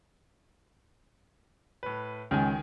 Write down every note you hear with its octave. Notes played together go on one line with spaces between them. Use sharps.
A2 B4
C#2 D#3 G#5